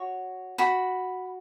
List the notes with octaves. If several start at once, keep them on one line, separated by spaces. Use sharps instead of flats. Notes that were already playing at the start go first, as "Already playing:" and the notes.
Already playing: F#4 C#5
F#4 B5